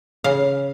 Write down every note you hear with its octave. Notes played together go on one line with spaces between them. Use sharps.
C#3 F5